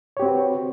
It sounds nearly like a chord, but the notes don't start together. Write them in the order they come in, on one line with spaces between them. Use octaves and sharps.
C#5 G4 C4 F#4 B4